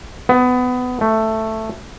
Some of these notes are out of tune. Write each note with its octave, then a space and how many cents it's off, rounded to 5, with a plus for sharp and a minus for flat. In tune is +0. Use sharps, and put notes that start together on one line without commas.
B3 +20
A3 +5